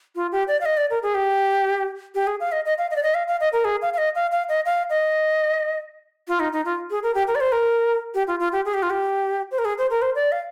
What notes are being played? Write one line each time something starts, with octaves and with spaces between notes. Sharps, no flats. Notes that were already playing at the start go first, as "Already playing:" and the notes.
F4
G4
D5
F5
D#5
D5
A#4
G#4
G4
G4
G#4
F5
D#5
D#5
F5
D#5
D5
D#5
F5
F5
D#5
A#4
G#4
F5
F5
D#5
F5
F5
D#5
F5
D#5
F4
D#4
D#4
F4
G#4
A#4
G4
A#4
D5
C5
A#4
G4
F4
F4
G4
G#4
G4
F4
G4
C5
A#4
G#4
C5
A#4
C5
D5
F5